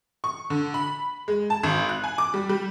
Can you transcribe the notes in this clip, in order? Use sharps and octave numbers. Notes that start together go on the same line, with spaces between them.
C#6
D3
B5
G#3
A5
G#1
F#6
G#5
D6
G3
G3